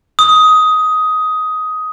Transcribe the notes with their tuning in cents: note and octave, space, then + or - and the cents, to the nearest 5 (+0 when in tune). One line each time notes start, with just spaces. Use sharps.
D#6 +10